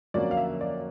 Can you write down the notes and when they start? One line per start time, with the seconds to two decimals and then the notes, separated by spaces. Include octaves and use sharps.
0.14 F2 D3 F#3 A#3 C#4 D5
0.31 F5
0.37 E5
0.61 D5